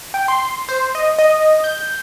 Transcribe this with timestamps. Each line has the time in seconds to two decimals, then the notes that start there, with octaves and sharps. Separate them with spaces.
0.14 G5
0.28 C6
0.69 C5
0.95 D#5
1.19 D#5
1.64 G6